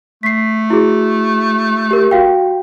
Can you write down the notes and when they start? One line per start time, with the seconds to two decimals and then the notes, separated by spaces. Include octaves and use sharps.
0.23 A3 B6 C7
0.70 E4 F#4 G#4
1.91 G4 A#4
2.11 F#4 F5 G5